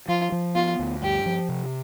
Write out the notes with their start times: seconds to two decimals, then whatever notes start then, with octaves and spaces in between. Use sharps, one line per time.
0.08 F3 F4
0.32 F3
0.55 B3 F4
0.79 D2
1.02 G2 G4
1.26 F3
1.49 C3